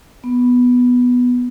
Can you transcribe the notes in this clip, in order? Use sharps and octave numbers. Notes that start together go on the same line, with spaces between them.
B3